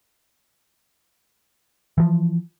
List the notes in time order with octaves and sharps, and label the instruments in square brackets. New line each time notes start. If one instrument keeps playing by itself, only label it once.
[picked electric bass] E3 F3